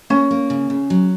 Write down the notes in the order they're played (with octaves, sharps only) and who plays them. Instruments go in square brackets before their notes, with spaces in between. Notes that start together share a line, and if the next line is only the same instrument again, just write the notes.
[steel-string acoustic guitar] A#3 [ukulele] C#4
[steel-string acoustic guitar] A#3
C#3
C#3
F#3